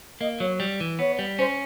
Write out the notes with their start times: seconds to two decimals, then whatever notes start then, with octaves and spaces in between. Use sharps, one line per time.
0.21 A#3 D#5
0.40 F#3 C#5
0.60 G3
0.80 E3
0.99 B3 C#5
1.19 G3
1.39 C#4 C5